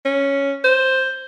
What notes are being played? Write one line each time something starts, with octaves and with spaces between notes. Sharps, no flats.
C#4
C5